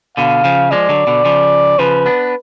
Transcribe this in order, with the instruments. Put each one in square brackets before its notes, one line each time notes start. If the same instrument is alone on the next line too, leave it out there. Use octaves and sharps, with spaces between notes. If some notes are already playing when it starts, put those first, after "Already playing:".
[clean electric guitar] B2 D3 [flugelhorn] F5
[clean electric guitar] C#3 F3
[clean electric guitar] F3 G#3 [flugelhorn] D5
[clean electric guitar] D3 F#3
B2 D3
C#3 F3
[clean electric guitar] C#3 F3 [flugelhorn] B4
[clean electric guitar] B3 D4